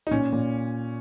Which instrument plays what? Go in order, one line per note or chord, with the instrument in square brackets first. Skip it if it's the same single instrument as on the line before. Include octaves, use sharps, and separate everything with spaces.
[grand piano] D#4
A#2 C#4
A#2